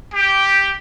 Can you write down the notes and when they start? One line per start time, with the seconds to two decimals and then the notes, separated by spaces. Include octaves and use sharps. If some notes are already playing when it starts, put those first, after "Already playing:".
0.14 G4